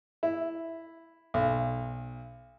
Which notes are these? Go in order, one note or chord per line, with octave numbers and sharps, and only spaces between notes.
E4
B1